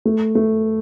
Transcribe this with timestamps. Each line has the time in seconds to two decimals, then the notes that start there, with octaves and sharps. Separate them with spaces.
0.05 A3
0.35 A3